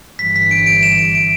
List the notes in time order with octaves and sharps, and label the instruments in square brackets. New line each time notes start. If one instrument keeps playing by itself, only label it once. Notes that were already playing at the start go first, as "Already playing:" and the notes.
[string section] G1 G2 E3 [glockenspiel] B6
[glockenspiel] B6
D7
D7
E7
D7
D7